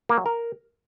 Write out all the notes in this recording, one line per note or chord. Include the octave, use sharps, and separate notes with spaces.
A#3
F#3
A#4